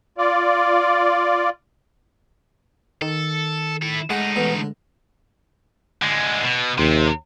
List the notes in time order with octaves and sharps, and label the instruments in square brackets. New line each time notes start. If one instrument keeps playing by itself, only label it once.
[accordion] F4 D5
[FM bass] D#3 [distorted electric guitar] A4
[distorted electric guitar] E4 A4
[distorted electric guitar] A2 D#4 [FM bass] G#3 [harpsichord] F#5
[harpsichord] A1 B2
D3
[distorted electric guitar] D3 G#3
B2
[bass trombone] D#2 [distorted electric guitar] C3